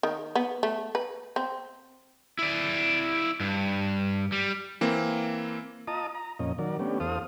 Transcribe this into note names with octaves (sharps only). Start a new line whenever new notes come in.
D#3
B3
A3
B4
C4
E4 D5
G2
G3
E3 A#3 C4
F4 D#5 A5 A#5 D#6
A#5
F2 A#2 C#4 D#5
D#3 F#3 A#4 D5
A3 B3 C#4 D4 G4
E2 A4 C5 F5 D#6